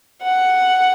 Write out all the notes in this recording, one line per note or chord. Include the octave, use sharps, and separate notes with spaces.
F#5